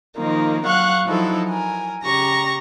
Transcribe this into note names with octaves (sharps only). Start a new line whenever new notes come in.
D#3 F3 A#3 D#4
F#3 F5 F#5 C#6 F#6
F3 F#3 D#4 E4 A4
A#4 G#5
C#3 G4 A#5 C#6 A#6